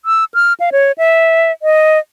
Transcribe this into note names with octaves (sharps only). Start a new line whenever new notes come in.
E6
F6
F5
C#5
E5
D#5